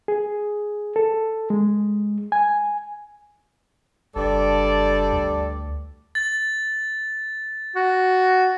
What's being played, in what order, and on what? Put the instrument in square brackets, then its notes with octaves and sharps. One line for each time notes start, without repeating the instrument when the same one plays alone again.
[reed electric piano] G#4
A4
G#3
G#5
[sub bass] F#1 [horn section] G2 A4 D5
[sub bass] D2
[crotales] A6
[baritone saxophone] F#4